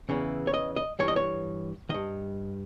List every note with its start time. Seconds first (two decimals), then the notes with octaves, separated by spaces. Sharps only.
0.09 E2 C#3 E3
0.47 C#5
0.54 D#5
0.76 D#5
0.99 G2 E3 C#5
1.08 D#5
1.16 C#5
1.89 G2 D#3 D#5